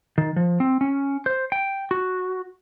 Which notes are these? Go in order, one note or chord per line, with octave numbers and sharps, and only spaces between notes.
D#3
F3
C4
C#4
C5
G5
F#4